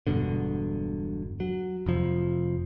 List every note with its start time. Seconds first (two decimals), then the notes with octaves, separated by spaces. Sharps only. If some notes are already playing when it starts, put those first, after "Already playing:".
0.07 E1 G2 B2 D3
1.40 F#3
1.86 F1 F2 F3